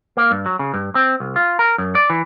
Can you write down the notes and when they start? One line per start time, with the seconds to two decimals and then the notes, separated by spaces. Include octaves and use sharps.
0.17 A#3
0.31 G2
0.46 F#3
0.59 C#3
0.74 G2
0.95 C4
1.20 C2
1.36 F4
1.59 A#4
1.78 F#2
1.95 D5
2.10 E3